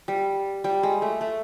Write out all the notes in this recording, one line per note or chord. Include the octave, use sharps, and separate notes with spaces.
G3
G3
G#3
A3
A3